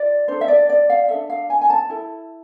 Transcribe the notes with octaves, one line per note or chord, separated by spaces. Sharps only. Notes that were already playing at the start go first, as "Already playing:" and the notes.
Already playing: F4 D5
D4 A4 C5
E5
D5
D5
F5
D4 A4 E5
F5
G#5
G#5
A5
E4 A4